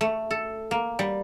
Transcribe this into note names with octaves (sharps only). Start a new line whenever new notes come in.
A3
A4
A#3
G3